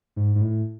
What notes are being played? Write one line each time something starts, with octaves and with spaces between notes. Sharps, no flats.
G#2
G#2
A2